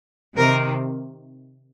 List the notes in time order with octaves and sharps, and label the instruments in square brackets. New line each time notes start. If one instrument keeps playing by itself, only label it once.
[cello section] C3 D#3 A#4